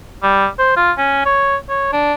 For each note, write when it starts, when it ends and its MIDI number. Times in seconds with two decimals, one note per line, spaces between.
0.23 0.47 55
0.59 0.75 72
0.77 0.91 65
0.98 1.22 61
1.25 1.56 73
1.69 1.91 73
1.93 2.14 62